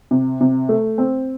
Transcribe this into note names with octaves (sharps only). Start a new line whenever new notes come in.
C3
C3
A3
C4